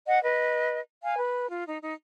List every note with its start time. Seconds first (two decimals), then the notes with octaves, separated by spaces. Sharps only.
0.07 D#5 F#5
0.23 B4 D#5
1.03 F5 G#5
1.18 B4
1.49 F4
1.66 D#4
1.82 D#4